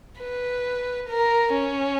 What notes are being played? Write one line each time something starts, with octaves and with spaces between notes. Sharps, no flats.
B4
A#4
C#4